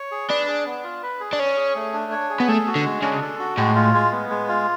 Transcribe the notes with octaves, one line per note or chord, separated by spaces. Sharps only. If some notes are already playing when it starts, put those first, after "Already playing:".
Already playing: C#5
G#4
D4 B4
G#4
B3
F4
B4
G#4
D4
C#4 C#5
G#4
A3
D4
C#5
G#4
B3
A3 A4
F#4
D3
G#3
C#3 D4
A4
F#4
A2 G#3
F4
G#3
B3
G#3
F4